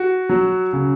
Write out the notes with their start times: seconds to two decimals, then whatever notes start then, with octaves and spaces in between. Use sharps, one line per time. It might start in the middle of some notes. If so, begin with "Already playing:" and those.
Already playing: F#4
0.29 F#3
0.73 C#3